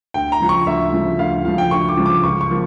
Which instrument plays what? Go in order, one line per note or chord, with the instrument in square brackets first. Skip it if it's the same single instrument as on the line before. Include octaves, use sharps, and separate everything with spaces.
[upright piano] D2 [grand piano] G5
[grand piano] A#5
[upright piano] C#3 F3
[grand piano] C#6
[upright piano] D2 [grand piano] E5
[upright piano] C#3 F3
[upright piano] D2 [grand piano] F5
[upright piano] C#3 F3 [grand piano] F5
[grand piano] G5
[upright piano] D2 [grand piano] C#6
[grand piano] D6
[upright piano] C#3 F3
[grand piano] D6
[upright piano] C#2 [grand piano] C#6
[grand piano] C#6
[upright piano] F3 A#3